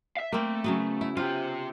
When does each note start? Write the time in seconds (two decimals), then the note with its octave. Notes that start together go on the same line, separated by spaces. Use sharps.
0.17 E5 F5
0.33 A3 A#3 C4
0.64 C#3 F#3 B3
1.01 E4
1.17 C3 F4 G4